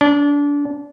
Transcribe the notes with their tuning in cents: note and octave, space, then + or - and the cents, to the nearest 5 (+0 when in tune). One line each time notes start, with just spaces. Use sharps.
D4 -25